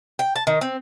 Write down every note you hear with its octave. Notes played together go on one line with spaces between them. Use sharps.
G5
A5
D#3
C4